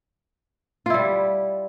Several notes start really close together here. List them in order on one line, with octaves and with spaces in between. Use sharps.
F4 E4 G3